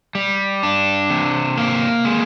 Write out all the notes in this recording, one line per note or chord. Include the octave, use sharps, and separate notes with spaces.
G3
D4
C3
A#3
G#3